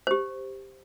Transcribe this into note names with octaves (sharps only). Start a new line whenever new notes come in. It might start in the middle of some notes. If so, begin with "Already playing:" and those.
G4 C5